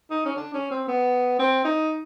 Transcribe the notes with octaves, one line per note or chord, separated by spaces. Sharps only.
D#4
C#4
D4
C#4
C4
B3
C4
D#4